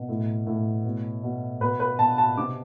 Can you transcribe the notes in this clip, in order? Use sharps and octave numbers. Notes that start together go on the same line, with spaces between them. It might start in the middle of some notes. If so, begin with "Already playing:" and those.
Already playing: B2
A2
A2
B2
B2
B2 B4
B4
B2 A5
A5
C3 D6